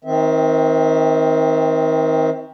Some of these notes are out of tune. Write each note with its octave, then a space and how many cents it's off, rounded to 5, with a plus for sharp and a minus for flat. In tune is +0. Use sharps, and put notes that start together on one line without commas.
D#3 +30 C4 +0 E5 -20